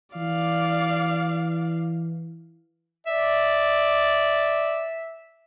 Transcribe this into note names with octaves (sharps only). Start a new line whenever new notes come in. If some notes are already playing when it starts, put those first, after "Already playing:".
E3 D5 F5
D5 E5